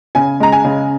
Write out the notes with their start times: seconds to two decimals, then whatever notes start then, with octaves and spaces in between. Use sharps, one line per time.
0.15 C#3 G#5
0.40 G#3 A#5
0.52 G#5
0.64 C#3